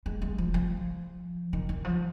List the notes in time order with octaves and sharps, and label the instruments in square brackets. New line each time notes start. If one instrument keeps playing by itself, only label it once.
[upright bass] G#3
G#3
F3
F3
D#3
D#3
F3